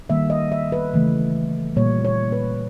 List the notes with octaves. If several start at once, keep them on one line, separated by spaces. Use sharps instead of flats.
D#3 G3 A#3 E5
D#5
E5
B4
C#3 E3 A3
A#2 G3 A#3 C#5
C#5
B4